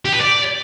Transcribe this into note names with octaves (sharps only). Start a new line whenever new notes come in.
G4
B4
D5